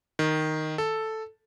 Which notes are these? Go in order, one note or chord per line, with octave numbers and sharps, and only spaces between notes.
D#3
A4